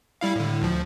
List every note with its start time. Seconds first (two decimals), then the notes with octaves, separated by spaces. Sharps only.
0.21 G3 E4 F5
0.36 A2 D3
0.62 D2 F3